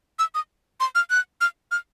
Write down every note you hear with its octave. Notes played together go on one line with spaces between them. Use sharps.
E6
D#6
C6
F6
F#6
F6
F6